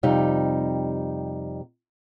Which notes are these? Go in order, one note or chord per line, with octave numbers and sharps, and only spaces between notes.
F2 C3 G3 D#4